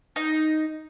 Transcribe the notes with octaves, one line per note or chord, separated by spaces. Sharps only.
D#4